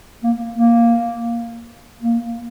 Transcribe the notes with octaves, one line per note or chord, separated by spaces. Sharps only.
A#3
A#3
A#3